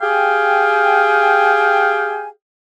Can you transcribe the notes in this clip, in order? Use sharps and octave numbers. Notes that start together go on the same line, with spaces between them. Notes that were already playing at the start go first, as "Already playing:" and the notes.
G4 G#4 F5 G5 G#5